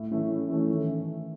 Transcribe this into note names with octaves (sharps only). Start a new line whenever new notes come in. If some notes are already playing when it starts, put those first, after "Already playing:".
Already playing: A2
E3 A3 C#4 E4
A2
E3 A3 C#4 E4
D#3